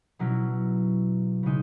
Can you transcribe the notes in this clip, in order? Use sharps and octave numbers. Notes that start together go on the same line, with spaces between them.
B2 F#3 C#4 E4
C#3 G#3 D#4